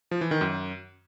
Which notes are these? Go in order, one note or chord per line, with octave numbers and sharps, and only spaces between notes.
F3
E3
D#3
F#2